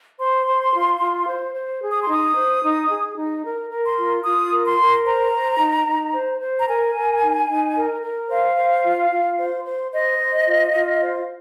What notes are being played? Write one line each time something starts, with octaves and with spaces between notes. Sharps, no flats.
C5 C6
C5
F4
F4
C5
C5
G#4
D#6
C6
D#4 D#6
C5
D#4
G#4
D#4
A#4
A#4
C6
F4
F4 D#6
A#4
C6
A#4
C5 A#5
C5
D#4
D#4
C5
C5
A#5
A#4 G#5
A#4
D#4
D#4
A#4
A#4
C5 F5
C5
F4
F4
C5
C5
C5 D#5
C5
F4
F4
C5